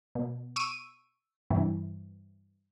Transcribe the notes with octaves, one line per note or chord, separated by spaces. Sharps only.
B2
C#6 E6 D7 D#7
G2 C3 E3